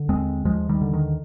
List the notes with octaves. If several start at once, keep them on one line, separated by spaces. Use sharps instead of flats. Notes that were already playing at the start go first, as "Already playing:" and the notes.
Already playing: D3
D#2 G#3 C4
D#2 F3 G#3
D#3 G3
D3
D#3